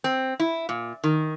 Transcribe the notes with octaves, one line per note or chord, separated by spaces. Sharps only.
C4
E4
A#2
D#3